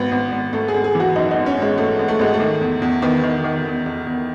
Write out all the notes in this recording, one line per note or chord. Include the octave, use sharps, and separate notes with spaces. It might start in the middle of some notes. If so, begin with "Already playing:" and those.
Already playing: G#1 B3
G#1
G#1
G#1 A3
G#4
G#1
G#4
E3
F#4
F#2 D#4
G#1 D#4
C#4
G#1
G#3
G#1 A3
G#1
A3
G#1 G#3
A3
D#3
E2
E2
D#3 B3
D#3
D#3
E2
E2
E2